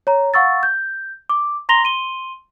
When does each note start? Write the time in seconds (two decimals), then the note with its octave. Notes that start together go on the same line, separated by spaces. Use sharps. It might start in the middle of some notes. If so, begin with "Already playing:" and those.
0.07 C#5 A#5
0.34 F5 F#5 C#6 E6 A6
0.63 G6
1.29 D6
1.69 A#5 C6 A#6 F7 G7
1.84 C6 D#7 G7